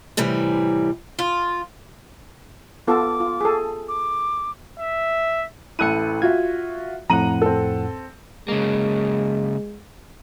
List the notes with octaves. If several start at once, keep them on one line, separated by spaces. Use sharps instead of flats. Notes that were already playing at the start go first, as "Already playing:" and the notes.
A2 C3 E3 G3
F4
B3 F4 A4 D6
F4
G#4 A4
D6
E5
A1 E4 A4 F#6 C#7 D#7
F4 F#4 E5 G#6
F2 A2 F#5 A#5 D#7 F#7
C4 A4
C#3 G#3 A#3